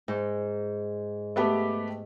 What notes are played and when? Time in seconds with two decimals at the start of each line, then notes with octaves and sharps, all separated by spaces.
0.08 G#2
1.36 A3 B3 G4